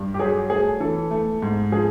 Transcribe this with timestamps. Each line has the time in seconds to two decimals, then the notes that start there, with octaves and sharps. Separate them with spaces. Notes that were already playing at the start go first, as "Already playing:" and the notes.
Already playing: G2
0.14 G4
0.19 F#3 G#4
0.50 A3 G#4
0.80 E3 A4
1.11 A3
1.42 G#2
1.72 F3 G#4